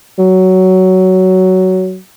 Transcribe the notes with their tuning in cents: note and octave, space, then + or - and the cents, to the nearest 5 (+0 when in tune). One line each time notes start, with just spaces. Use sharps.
F#3 +10